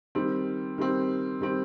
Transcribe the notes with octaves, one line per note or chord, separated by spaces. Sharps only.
D#3 G3 C4
D#3 G3 C4
D#3 G3 C4